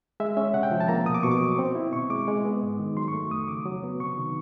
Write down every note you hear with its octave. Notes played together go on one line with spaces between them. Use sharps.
G#3 E5
C#4 E5
C3 F#5
G5
F3
A5
A#3 A#5
B2 D#6
D6
B2 C#6
D6
F#3
C4
E4
B2 C#6
G#3 D6
G#3
B3
G#2
D#3
F#3 C6
C#6
A3
F2 D#6
C#3 D6
F#3
B3
C3 C#6
D#3